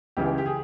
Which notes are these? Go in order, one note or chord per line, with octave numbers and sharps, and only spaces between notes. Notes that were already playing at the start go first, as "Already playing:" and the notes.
C#2 C#3 E3 G4
G4
G#4